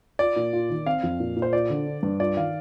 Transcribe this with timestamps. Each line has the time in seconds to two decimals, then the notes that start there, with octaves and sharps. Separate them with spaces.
0.19 F4 D5
0.36 A#2
0.53 F4
0.70 D#3
0.86 C4 F5
1.03 F2
1.20 A#2
1.36 A#2
1.42 C5
1.53 F4 D5
1.70 D3
1.87 D4
2.03 G2
2.20 F4 D5
2.37 D#3 F5